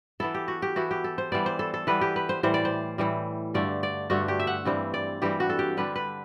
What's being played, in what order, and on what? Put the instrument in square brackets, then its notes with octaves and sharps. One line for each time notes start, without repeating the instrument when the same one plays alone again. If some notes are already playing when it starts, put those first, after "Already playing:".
[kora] E3 B3 E4 A4
G4
F#4
G4
E3 B3 E4 F#4
G4
A4
C5
E3 G3 B3 D5
C5
A4
A4
E3 G3 B3 B4
G4
B4
C5
A2 E3 G3 C5
D5
C5
A2 E3 G3
G2 D3 A3 D5
D5
G2 D3 A3 F#4
G4
E5
F#5
G2 E3 G3 C4
D5
G2 E3 G3 C4 G4
F#4
A4
G4
D3 G3 D4 B4
B4